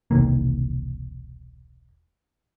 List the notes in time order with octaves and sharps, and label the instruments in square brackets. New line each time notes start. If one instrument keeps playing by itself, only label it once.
[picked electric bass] E1 C2 D#3 A#3